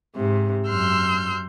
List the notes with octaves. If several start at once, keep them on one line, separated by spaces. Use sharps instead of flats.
G#2 C3
F#2 C6 E6 F6 G6